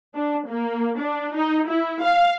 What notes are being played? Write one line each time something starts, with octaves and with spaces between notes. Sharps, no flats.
D4
A#3
D4
D#4
E4
F5